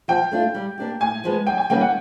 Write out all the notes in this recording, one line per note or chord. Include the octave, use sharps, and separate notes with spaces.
F3 G5
A3 D4 F4
G3
A#3 D4 G4
A2 G#5
F3 G#3 B3
F#2 G5
G#5
D#3 G3 A#3 C#4 G5
F#5